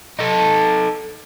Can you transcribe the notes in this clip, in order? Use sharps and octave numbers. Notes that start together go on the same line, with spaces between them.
D#4 A4